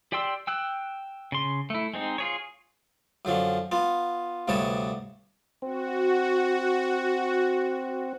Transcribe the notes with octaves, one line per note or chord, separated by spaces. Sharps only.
G4 D5 G5 C6 E6
G5 E6 F#6
C#3 C6
A3 E4
G#3 C4 D#4
F4 G#4 C#5
F#2 D3 F3 C#4
B3 F4
D2 G2 C3 B3 C#5 A5
C4 F#4